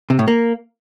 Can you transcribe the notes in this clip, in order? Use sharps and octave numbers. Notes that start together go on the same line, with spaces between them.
C3
A2
A#3